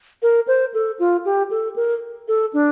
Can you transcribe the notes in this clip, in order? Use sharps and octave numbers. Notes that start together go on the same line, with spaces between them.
A#4
C5
A4
F4
G4
A4
A#4
A4
D4